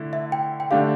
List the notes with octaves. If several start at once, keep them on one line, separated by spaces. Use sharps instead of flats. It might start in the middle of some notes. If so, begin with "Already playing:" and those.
Already playing: D3 A3 E4
E5
G5
G5
D3 A3 D4 G4 F5